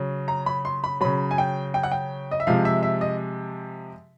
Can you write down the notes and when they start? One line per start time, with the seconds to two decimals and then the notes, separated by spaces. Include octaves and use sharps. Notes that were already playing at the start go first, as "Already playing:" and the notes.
Already playing: C#3 F#3
0.28 A#5
0.46 B5
0.65 C6
0.84 B5
1.01 C#3 F#3 B5
1.31 G#5
1.38 G5
1.74 G5
1.83 F#5
1.92 G5
2.31 D#5
2.40 E5
2.47 C3 F3 G#3 F5
2.65 E5
2.83 E5
3.01 D#5